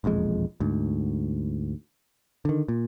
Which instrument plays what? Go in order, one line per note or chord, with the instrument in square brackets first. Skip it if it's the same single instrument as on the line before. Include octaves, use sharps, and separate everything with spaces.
[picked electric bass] E1 A#1 F2 G#3
D2 G#2
D3 D#3
A#2